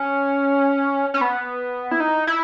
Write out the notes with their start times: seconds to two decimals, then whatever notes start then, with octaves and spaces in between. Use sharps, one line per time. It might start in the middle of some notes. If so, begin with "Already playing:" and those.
Already playing: C#4
1.14 C#4
1.21 B3
1.91 E4
2.00 D#4
2.27 E4